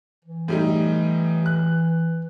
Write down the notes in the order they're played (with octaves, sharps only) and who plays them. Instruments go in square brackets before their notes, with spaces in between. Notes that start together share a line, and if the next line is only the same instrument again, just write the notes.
[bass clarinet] E3
[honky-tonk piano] A2 G3 D#4
F#6